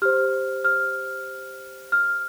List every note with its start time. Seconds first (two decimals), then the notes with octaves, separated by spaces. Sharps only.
0.02 G4 C5 F6
0.65 F6
1.92 F6